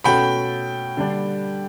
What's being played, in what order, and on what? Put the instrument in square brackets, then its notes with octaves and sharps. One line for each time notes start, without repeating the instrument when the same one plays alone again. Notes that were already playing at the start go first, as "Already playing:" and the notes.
[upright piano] B2 A3 C#4 F#4 A4 [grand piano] G5 B5
[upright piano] D3 G3 D4